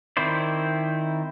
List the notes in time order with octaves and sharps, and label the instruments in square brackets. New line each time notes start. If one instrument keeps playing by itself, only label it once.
[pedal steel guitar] D#3 C4 E4 C5 D5